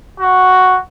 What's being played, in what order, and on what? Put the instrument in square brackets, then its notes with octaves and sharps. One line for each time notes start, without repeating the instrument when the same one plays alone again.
[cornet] F#4